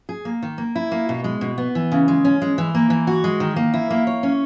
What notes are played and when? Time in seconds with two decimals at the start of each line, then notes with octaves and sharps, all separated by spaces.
0.09 G#4
0.25 A#3
0.43 D#3
0.58 A#3
0.76 E4
0.92 A#3
1.09 B2
1.24 G#3
1.41 B2
1.58 B3
1.75 E3
1.92 C#3
2.08 G#3
2.25 C#4
2.42 G#3
2.58 E3
2.75 A#3
2.90 E3
3.07 F#4
3.24 G#3
3.40 D#3
3.56 A#3
3.74 E4
3.90 A#3
4.07 C#5
4.23 C#4